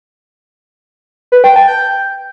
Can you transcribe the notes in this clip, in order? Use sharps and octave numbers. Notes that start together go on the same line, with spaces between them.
B4
G5
A5
G5